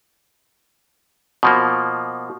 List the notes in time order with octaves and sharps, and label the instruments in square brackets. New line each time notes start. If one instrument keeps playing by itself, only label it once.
[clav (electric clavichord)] B2 F3 A#3